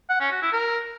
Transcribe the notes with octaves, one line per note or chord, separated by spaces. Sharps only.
F#5
C#4
F#4
E4
A#4